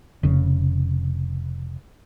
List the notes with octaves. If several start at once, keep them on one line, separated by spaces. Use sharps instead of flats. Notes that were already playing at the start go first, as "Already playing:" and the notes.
F1 C#3